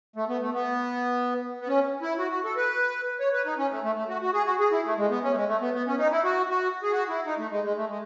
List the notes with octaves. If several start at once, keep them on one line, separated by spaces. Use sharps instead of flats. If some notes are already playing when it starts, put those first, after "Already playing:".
A3
B3
A3
B3
B3
C#4
E4
F#4
F#4
A4
B4
C#5
B4
D#4
C#4
A3
A3
A3
F#4
F#4
G#4
F#4
G#4
E4
A3
G#3
B3
C#4
A3
G#3
A3
B3
B3
C#4
D#4
E4
F#4
F#4
G#4
F#4
E4
D#4
A3
G#3
G#3
A3
G#3